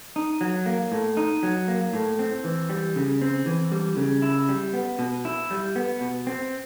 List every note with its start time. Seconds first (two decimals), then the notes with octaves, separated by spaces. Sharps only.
0.16 D#4
0.41 F#3
0.66 A#3
0.92 A2
1.17 D#4
1.43 F#3
1.68 A#3
1.93 A2
2.19 C4
2.44 E3
2.70 G3
2.96 C#3
3.22 C4
3.46 E3
3.72 G3
3.97 C#3
4.22 E4
4.49 G3
4.73 B3
4.99 B2
5.25 E4
5.51 G3
5.76 B3
6.01 B2
6.27 C4